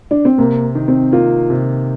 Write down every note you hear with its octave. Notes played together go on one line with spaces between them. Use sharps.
D4
C4
C3 A#3
D#3
C4
A#3 F4
C3